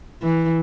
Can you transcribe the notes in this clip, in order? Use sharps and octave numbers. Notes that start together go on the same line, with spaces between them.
E3